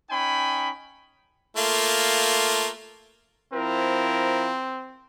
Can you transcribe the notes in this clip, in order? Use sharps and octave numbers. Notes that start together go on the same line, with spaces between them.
C#4 D#4 G5 G#5 B5
A3 A#3 F4
F3 C4 E4 A#4